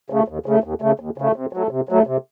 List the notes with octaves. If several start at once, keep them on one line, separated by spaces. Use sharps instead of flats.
C#3 A3
D#2
C#3 A3
D#2
C#3 A3
D#2
C#3 A3
C3
F#3 A3
C3
F#3 A3
C3